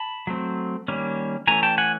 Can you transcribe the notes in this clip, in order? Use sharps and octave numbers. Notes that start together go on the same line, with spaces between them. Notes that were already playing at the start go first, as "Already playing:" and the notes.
Already playing: A5 B5
F#3 A3 C4
D#3 G3 A#3 C#4
E3 A3 C#4 G#5 A#5
G5 A5
F#5 G#5